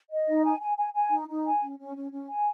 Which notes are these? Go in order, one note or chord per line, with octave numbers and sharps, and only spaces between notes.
D#5
D#4
G#5
G#5
G#5
G#5
D#4
D#4
G#5
C#4
C#4
C#4
C#4
G#5